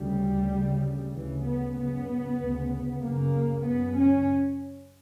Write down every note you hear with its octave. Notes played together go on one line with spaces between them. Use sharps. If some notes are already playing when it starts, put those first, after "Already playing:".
Already playing: D2 C#3 G3
D2 C#3
D2 C#3 E3
B3
F#2 C#3 B3
D2 C#3
F#2 C#3 A#3
F#2 C#3 B3
C#4